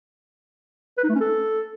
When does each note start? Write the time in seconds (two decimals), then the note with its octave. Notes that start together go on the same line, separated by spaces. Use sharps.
0.98 B4
1.04 D#4
1.09 A3
1.15 C#4
1.21 A4